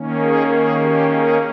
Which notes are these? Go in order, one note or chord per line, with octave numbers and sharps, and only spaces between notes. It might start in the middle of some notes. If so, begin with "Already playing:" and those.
Already playing: D#3 A#3 C#4
G#4
G#4
G4
G#4